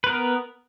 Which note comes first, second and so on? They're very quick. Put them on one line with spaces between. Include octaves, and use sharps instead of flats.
B4 A#4 B3